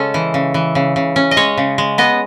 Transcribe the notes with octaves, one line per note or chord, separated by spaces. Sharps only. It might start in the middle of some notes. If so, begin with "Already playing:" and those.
Already playing: C#3 G#3 C#4 A4
E3
C#3
E3
C#3
C#3
C#4
D#5
G#3 C#5
C#3
G#3
B3 D#5